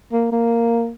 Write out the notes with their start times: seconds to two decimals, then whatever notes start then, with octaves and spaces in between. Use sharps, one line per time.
0.12 A#3
0.32 A#3